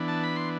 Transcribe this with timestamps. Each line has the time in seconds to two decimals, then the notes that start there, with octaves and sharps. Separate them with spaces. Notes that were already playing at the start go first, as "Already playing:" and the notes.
Already playing: E3 B3 D4
0.08 A5
0.23 B5
0.36 C6